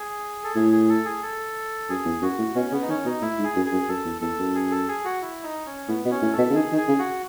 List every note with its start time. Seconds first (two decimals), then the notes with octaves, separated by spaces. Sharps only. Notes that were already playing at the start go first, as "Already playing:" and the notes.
Already playing: G#4
0.44 A4
0.56 A2 G#4
0.72 G#4
0.89 A4
1.05 G#4
1.23 A4
1.89 F#2 G#4
2.05 E2
2.22 F#2 F#4
2.38 A2
2.55 B2 C#4
2.72 C#3 B3
2.82 D#4
2.89 D#3 C#4
3.05 B2 D#4
3.22 A2 E4
3.38 G#2
3.44 G#4
3.56 F#2
3.66 G#4
3.72 F#2
3.88 F#2 A4
4.05 E2
4.22 E2 A4
4.39 F#2
4.55 G#4
4.71 A4
4.88 G#4
5.05 F#4
5.22 E4
5.43 D#4
5.66 C#4
5.88 A2 B3
6.05 B2
6.11 C#4
6.22 A2
6.33 A4
6.38 B2
6.50 C#3
6.55 D#3 G#4
6.72 D#3
6.78 G#4
6.88 C#3
6.99 F#4